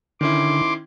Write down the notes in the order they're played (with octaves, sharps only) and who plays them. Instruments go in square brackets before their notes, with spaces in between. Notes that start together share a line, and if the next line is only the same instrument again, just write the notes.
[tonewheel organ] D3 [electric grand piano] D#3 C#4 E4 [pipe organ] C6 D6